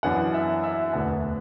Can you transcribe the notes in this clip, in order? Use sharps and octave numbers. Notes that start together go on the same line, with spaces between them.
F#2 E3 B3 D4 F#5
E5
E5
E1 D2 D3 B3 D4 F#5